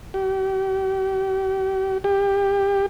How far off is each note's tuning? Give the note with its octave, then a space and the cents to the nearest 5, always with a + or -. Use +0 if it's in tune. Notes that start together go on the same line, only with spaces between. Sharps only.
G4 -40
G4 +20